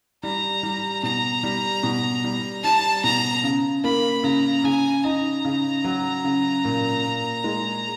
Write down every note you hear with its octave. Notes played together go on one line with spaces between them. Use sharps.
G3 A#5
G3
B2 A#5
G3
B2
G3
G3 A5
B2 A#5
C#3
A#3 B5
C#3 A#5
C#3 G#5
D#4 A#5
C#3
F#3
C#3
A#2
A#2
G#3